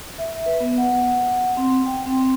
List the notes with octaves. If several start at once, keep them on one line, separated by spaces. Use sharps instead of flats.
E5
B4
B3
F#5
C4
G5
C4